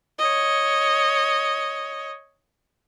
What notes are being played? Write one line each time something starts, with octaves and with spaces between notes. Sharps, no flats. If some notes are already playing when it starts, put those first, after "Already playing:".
C#5 D#5